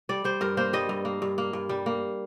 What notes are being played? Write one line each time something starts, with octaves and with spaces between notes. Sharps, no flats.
G3 D5
G3 C5
G2 A#4
A#3 C5
G3 D#5
G2
A#3
G2
A#3
G2
G3
A#3